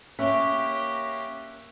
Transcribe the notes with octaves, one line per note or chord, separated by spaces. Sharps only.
A#3 C#4 G4 E5 C#6 F#6 B6